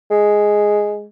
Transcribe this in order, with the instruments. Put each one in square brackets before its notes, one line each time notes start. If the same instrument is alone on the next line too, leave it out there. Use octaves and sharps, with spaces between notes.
[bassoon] G#3